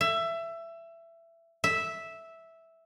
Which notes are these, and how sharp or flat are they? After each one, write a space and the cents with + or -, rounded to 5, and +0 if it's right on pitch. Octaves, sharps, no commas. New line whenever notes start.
E5 +20
E5 -5